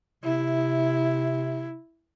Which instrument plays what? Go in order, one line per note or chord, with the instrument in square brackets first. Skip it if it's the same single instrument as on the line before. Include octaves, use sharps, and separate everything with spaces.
[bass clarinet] C3 [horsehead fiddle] E4